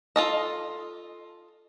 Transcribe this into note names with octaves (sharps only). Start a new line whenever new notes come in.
F4 A4 D#5